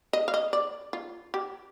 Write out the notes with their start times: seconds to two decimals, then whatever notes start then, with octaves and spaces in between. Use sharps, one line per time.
0.13 D#5
0.28 F5
0.34 D#5
0.53 D5
0.93 F4
1.34 G4